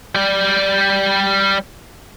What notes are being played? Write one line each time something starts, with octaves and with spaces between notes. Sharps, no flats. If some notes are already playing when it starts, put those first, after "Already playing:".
G3 D5